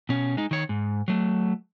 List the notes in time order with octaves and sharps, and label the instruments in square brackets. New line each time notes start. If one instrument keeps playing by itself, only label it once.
[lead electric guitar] B2 C#4
G#3 D#4
D#3 C#5
G#2
F#3 A3